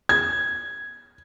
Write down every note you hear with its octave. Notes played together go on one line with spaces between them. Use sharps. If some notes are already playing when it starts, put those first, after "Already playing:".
G#6